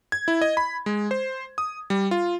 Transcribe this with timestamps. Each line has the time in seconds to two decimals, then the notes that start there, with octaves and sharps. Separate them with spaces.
0.12 G#6
0.28 E4
0.41 D#5
0.57 B5
0.86 G#3
1.11 C5
1.58 D#6
1.90 G3
2.11 F4